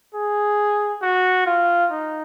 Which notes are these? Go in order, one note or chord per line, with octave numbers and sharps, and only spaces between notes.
G#4
F#4
F4
D#4